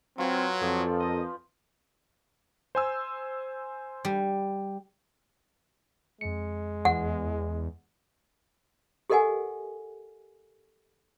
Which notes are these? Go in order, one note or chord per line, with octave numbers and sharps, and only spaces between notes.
F#3 C4 F4 B4 G#5
F2 F3 G4 A4 D5
A#4 D#5
C5 G#5 E6
G3
F2 G#3 C#7
E2 F#5
G4 A4 A#4 D#5 F#5 G#5